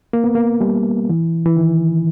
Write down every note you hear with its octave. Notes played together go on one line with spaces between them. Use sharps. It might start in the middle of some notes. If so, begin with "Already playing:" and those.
A#3
B3
A#3
G3
E3
E3
D#3